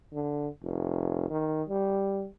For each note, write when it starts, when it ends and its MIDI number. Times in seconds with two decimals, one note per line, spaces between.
0.13 0.48 50
0.62 1.26 29
1.30 1.63 51
1.69 2.27 55